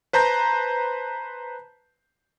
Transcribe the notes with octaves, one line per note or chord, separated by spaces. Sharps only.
B4 C5 A5 A#5 G6